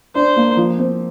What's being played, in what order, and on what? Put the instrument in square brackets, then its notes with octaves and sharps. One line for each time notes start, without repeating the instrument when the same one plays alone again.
[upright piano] D4 [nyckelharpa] C5
[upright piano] A#3
F3
C4